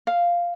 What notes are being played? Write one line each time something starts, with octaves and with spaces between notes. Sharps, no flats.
F5